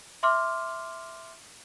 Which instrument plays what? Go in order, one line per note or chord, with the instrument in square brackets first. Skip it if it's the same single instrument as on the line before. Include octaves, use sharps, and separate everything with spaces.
[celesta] E5 C6 D6 F6